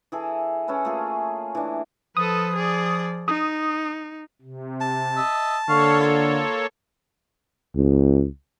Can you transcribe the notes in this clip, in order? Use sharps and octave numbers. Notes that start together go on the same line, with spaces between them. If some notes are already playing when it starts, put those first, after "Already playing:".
E3 G#4 A4
C#4 E4 A4 B4
A3 A#3 F4 G#4
E3 D4
F3 A4 B4 D#6
G#4 D5
D#4 D#6
C3
A5
D#5 E5
D3 A#3 A4 C#5 F5 C#6
F4
C#2